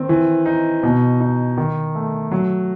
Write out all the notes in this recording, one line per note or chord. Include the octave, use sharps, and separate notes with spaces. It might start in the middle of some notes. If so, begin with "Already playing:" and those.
Already playing: D#3 C4
E3
D#4
B2
D#4
D#3
A3
F#3